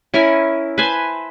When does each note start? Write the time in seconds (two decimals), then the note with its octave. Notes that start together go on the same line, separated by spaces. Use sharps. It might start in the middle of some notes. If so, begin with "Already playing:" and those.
0.14 C#4 E4 A#4 G#5
0.78 B4 C5 G#5 A5